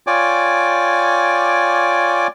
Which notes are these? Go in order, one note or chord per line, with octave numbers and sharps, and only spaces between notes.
F4 C#5 D5 G5 G#5 D6